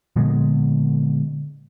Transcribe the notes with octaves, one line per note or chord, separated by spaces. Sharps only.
A#2 D3 G#3 B3